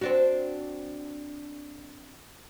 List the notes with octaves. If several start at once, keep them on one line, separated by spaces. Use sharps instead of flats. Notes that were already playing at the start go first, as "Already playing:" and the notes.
C4 D4 F#4